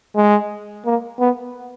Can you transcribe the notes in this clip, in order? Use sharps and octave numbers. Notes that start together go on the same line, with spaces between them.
G#3
A#3
B3